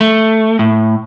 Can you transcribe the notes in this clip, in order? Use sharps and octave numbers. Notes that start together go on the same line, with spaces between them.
A3
A2